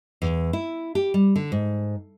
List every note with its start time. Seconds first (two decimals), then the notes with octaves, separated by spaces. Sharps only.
0.22 E2
0.53 E4
0.95 G4
1.14 G3
1.36 D3
1.52 G#2